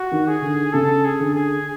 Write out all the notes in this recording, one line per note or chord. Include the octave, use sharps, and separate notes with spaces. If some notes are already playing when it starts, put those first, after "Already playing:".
Already playing: F#4
D#3
G#4
D3
C#3 A4
G#4
D3
G#4